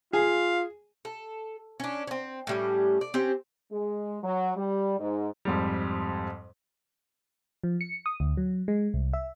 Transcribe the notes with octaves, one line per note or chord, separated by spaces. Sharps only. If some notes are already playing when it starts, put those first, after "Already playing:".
F4 G#4 F5
A4
C#4 D4
C4 C#4
A2 G3 C#4
D5
C4 C#4 G4
G#3
F#3
G3
G#2
F2 G#2 G3
F3
C#7
D#6
D2
F#3
G#3
C2
E5